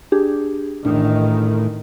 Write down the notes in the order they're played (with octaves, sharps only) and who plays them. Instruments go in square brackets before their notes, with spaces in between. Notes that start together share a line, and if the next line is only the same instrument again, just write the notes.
[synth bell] D4 G4 G#4
[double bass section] A1 D#3 [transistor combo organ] A2 [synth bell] D4